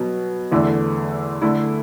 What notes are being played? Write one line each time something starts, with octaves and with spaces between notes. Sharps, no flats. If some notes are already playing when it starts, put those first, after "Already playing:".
Already playing: B2 F#3 B3
E2 D3 A3 E4
D3 A3 E4